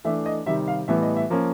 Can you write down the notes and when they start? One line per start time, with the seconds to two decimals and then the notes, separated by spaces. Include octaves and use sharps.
0.05 E3 A3 D4 E5
0.26 D#5
0.46 C3 D#3 G3 E5
0.68 F5
0.88 A2 E3 G3 B3 E5
1.02 D#5
1.17 E5
1.30 F3 A#3 C#4